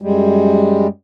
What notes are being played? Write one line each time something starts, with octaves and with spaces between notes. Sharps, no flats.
F#2 G3 G#3